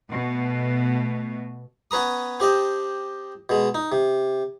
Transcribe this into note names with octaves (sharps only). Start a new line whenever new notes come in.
B2 A3
B3 C#4 B4 A#5 D#6
C4 G4 D#5 A5
B2 G#3
D#4
C3